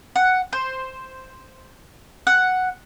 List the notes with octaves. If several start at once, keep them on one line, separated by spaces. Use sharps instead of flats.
F#5
C5
F#5